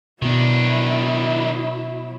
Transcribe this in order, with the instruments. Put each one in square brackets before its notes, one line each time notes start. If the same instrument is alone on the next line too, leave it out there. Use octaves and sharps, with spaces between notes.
[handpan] B2 B3 [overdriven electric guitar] D#3 D4 [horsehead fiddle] F#3 E4